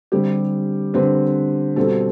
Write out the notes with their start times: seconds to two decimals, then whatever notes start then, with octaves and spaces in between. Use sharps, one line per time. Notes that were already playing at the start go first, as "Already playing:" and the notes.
0.12 D3 G3 C4 G4
0.94 D3 G3 C4 B4
1.76 B2 G3 C4 A4